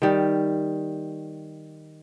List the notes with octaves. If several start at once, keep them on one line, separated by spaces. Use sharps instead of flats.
D#3 G3